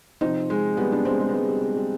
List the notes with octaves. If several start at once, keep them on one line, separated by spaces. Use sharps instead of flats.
C3 F3 C4 D#4
G#3
G3 B3
B3 D4
G#3 C4
G#3
B3
G#3
G3
G#3
G3